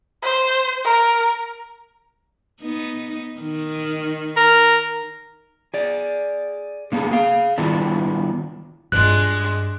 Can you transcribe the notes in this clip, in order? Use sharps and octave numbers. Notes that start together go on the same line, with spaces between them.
C5
A#4
B3 D#4
D#3
A#4
G#4 D5
D3 A#3 B3 G#4
G#4 F5
D#3 G3 B3 D4 E4 F4
G2 G#3 D4 F4 F#6